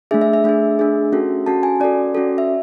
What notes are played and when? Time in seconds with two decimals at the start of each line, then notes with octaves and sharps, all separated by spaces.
0.11 A3 D4 G#4 E5
0.21 E5
0.33 E5
0.44 A3 D4 G#4 E5
0.79 A3 D4 G#4
1.12 C#4 F#4 A4
1.46 C#4 F#4 A4 A5
1.63 G#5
1.80 C#4 F#4 A4 D5
2.15 C#4 F#4 A4
2.38 E5